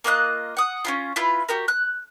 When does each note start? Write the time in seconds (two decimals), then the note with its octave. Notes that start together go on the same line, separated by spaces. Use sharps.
0.04 A#3 F4 D#5 F#6
0.57 F#5 D#6
0.85 C#4 E4 F4
1.16 E4 F4 B4 F5
1.49 F#4 G4 A#4
1.68 F#6